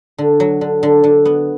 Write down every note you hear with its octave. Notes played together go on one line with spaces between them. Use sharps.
D3
F#3
D3
D3
D3
B3